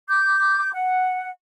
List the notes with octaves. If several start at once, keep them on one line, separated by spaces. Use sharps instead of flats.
D6 G6
F#5